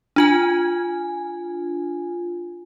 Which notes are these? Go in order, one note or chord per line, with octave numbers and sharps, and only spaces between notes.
D4 F4 G#5